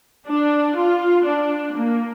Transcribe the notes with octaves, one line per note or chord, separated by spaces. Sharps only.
D4
F4
D4
A#3